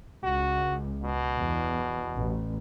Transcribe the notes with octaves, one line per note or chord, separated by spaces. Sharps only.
C#2 F#4
B2
E2
A1